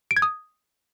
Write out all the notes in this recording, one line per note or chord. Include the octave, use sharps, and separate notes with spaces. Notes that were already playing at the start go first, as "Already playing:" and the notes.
D7
G#6
D#6